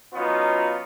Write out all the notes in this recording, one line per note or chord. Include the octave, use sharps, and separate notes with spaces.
F#3 B3 C#4 D#4 F4